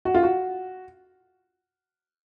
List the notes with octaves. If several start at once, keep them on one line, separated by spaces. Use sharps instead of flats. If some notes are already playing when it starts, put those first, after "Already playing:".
F#4
F4
F#4